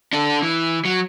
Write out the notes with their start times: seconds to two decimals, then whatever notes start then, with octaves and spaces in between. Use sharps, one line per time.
0.13 D4 A4
0.42 E3
0.85 F#3